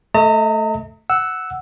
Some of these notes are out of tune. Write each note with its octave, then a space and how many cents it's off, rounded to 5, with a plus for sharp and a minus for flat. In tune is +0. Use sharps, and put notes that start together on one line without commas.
A3 +0 D#5 +35 A#5 -40
F#5 +0 E6 +0